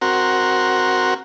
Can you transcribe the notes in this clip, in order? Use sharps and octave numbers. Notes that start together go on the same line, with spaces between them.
C4 F#4 A#4